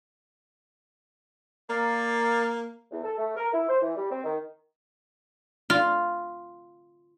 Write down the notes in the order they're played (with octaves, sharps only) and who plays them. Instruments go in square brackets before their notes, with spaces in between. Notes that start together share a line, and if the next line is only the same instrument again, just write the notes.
[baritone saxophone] A#3 [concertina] A#4 D5 F5
[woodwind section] E2
A4
A3
A#4
E4
C5
E3
G3
C4
D#3
[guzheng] F4